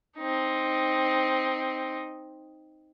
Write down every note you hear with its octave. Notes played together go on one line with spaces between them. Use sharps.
C4 D#4